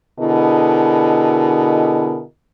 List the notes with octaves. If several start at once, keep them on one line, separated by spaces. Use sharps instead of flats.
B2 D3 E4 G#4 A#4 D#5